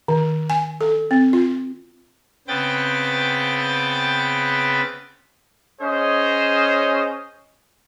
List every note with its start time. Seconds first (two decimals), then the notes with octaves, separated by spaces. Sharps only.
0.08 D#3
0.50 G#5
0.81 A4
1.11 C4
1.33 F4
2.48 C#3 B3 C4 B4 G5 A6
5.81 C#4 G#4 C5 C#5 D#5